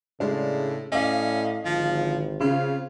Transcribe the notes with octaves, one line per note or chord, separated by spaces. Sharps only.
A2 C#3 G#3 D4
A2 C#4 D5 D#5 F5
G#1 D3 F3
C#3 C4 F4